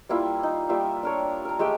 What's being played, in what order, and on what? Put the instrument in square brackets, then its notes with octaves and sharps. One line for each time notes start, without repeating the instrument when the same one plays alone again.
[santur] G3 A#3 E4 F4
D#4
G3 A#3 F4 E5
D4 A#4 C#5
A#4 A#5
G#3 A3 G4 G5